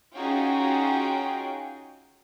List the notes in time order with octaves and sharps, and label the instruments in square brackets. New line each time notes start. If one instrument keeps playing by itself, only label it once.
[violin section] C#4 D#4 F4 F#4 G#4 G5